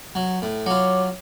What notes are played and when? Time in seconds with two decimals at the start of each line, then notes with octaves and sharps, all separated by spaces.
0.15 F#3
0.42 A2
0.66 F#3 F4 C#5 D6